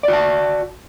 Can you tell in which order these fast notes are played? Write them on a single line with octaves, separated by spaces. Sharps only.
D5 F#4 A5